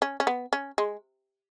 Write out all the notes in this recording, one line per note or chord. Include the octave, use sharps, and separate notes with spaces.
C#4
C#4
B3
C#4
G#3